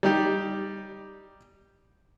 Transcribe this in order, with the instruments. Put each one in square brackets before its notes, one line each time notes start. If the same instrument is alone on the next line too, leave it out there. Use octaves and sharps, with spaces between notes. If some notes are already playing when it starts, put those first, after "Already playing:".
[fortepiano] G3 D#4 G4